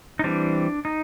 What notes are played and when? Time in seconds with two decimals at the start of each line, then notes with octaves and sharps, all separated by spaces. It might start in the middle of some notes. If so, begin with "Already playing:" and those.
0.19 D#4
0.24 E3 G3 C4 D4
0.85 D#4